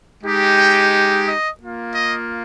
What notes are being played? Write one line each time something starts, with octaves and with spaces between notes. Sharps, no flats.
G#3 D#4 G4
G5
D#5
A#3 F4
D#5